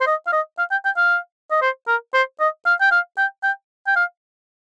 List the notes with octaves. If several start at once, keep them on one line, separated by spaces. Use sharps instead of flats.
C5
D#5
F5
D#5
F5
G5
G5
F5
D#5
C5
A#4
C5
D#5
F5
G5
F5
G5
G5
G5
F5